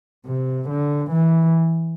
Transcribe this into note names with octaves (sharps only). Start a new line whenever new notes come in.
C3
D3
E3